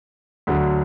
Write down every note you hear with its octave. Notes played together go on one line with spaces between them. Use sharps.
D2 D3 F#3